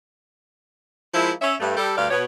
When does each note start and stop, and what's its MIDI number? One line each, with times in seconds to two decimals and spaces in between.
1.14 1.31 53
1.14 1.31 56
1.14 1.31 58
1.14 1.31 64
1.42 1.55 61
1.42 1.55 76
1.60 1.75 43
1.60 1.75 57
1.77 1.95 55
1.77 1.95 69
1.97 2.08 38
1.97 2.08 43
1.97 2.08 55
1.97 2.08 67
1.97 2.08 74
1.97 2.08 77
2.11 2.24 47
2.11 2.24 59
2.11 2.24 73